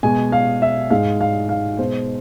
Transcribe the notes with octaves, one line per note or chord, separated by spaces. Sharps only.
B2 G#3 G#5
F5
E5
G#2 G#3 F5
F5
F5
B2 G#3 C5